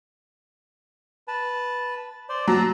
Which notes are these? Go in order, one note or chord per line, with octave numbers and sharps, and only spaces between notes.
B4 A5
C5 D5
F#3 A5 A#5